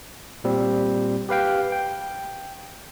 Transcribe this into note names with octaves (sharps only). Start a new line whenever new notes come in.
A#2 G3 C4
G4 B4 F5 G5
G5